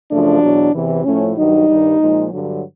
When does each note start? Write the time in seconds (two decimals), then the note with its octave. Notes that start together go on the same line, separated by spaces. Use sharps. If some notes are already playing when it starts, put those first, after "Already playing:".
0.09 F#2 C#3 F3 A3 D4
0.41 E2 B2 F#3
0.73 E2 C3 E3
1.04 A2 F3 A3 C#4
1.36 G2 D#3 F#3 D#4
1.68 G2 D#3 G3
1.99 A#2 F3 G#3
2.31 G2 D3 F#3